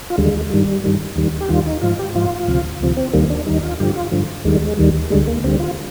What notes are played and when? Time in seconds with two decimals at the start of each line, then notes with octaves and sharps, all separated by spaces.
0.10 F4
0.18 D#2 D3 G3 G#3
0.50 G2 D#3 G3
0.84 G2 D#3 G3
1.16 D#2 D#3 G3
1.41 G4
1.49 D#2 D#3 G3 F4
1.66 D#4
1.81 G#2 F3 F4
1.99 G4
2.15 G#2 F3 F4
2.48 D2 C3 F3
2.80 D2 C3 F3
2.97 C4
3.13 D#2 D#3 G3 A#3
3.30 D4
3.46 D#2 D#3 G3 D#4
3.63 F4
3.80 G2 D3 F3 G4
3.96 F4
4.12 G2 D3 F3
4.45 D#2 D#3 G3 G#3
4.62 G#3
4.77 D#2 D#3 G3
5.10 D2 D3 G3 G#3
5.27 A#3
5.44 D2 D3 G3 C4
5.60 F4